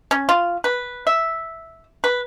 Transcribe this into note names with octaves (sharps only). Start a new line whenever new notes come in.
C#4
F4
B4
E5
B4